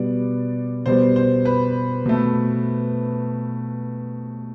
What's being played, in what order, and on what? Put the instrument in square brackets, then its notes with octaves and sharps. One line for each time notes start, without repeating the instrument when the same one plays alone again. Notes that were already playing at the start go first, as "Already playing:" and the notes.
Already playing: [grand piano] B2 G3 B3 D5
B2 G3 B3 C5
C5
B4
B2 A3